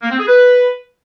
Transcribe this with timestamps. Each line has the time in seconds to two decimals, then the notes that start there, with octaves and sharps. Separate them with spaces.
0.03 A#3
0.11 C4
0.19 G#4
0.27 B4